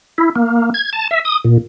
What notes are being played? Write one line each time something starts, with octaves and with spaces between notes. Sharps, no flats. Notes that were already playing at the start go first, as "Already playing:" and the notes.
E4
A#3
G#6
A5
E5
D#6
A#2